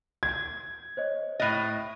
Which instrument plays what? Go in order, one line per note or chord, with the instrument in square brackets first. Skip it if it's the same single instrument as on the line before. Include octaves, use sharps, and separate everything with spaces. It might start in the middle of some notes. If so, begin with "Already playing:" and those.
[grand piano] G#6
[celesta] C5 C#5 D#5
[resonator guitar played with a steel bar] A2 D#5 [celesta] B5 F#6 A6